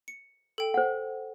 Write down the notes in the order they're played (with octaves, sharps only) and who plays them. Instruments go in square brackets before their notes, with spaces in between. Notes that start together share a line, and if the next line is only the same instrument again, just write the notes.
[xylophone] C#7
A4 G5
[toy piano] C5 F#5